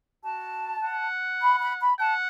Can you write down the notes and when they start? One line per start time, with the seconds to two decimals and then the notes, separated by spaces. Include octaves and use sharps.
0.24 F#4 A5
0.83 F#5
1.41 B5
1.60 B5
1.80 B5
1.99 F#5 A5